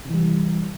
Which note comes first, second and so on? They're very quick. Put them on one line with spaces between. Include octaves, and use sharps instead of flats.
C3 E3 G3